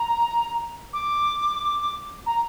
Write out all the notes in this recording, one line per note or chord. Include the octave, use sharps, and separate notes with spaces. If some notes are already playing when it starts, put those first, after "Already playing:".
Already playing: A#5
D6
A#5